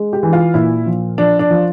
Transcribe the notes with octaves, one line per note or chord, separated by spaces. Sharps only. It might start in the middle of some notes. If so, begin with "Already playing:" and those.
Already playing: G#3
G4
E3
F4
A#2 E4
F3
F3 D4
D4
F3